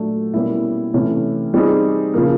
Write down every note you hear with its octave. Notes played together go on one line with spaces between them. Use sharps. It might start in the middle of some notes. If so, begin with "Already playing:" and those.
Already playing: A#2 F#3 A3 D4
B2 G3 A#3 C#4 E4
C3 E3 A3 C#4 E4
G3 C4 D#4 G#4
C#3 F3 A#3